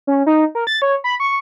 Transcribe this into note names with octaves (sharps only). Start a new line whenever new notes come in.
C#4
D#4
A#4
A6
C#5
B5
C#6